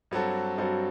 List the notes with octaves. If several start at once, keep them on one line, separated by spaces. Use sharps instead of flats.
G2 F#3 C4 F#4 A4
G2 F#3 C4 F#4 A4